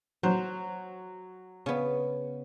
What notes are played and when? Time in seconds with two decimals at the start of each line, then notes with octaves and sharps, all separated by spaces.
0.23 F#3 C5
1.66 C#3 B3